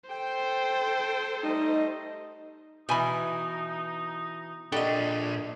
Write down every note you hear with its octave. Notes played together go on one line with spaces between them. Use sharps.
A4 C5 G5
G3 A3 D#4 D#5
B2 E3 D#4 E5 G#5 B5
A#2 G3 D4 F#4 G4 A4 D#5